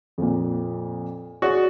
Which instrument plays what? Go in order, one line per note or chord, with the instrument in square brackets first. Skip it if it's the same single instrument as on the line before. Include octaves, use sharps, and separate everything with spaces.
[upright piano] F2 A#2
[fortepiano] F#4 [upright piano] G#4 C#5 D5